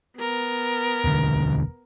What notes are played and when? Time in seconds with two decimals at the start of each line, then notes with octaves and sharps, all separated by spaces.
0.17 B3 A#4
1.04 E1 D2 D3